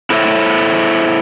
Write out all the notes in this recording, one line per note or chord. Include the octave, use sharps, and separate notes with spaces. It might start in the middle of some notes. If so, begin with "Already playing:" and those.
E4 A4 C5 C#5 E5